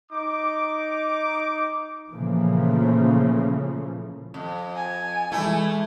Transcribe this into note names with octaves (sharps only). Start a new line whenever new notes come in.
D#4 D6
A#2 C#3 E3 F3 A3 A#3
F2
G#5
E3 G#3 A3 E4